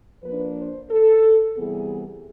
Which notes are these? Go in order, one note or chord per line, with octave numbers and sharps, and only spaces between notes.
F3 A#3 D4 B4
C5
A4
C3 E3 G3 B3 G#4